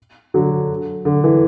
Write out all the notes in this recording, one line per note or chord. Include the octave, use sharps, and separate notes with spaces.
D3 F#3
D3
E3